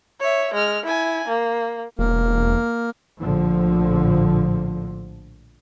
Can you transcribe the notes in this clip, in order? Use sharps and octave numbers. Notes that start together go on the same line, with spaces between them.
C#5 E5
G#3 F6
E4 G#5
A#3
E1 A#3
A#1 A2 D3 F3